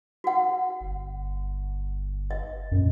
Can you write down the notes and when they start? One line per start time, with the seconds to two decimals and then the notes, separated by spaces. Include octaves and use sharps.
0.24 F#4 F#5
0.81 G1
2.31 D#5
2.72 F#2 A#2